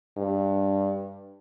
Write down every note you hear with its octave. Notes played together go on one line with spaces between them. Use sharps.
G2